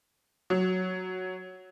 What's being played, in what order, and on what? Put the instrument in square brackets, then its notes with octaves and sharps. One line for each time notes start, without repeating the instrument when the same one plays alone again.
[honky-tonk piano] F#3